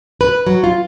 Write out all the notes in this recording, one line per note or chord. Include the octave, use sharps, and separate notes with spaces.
B4
F#3
F4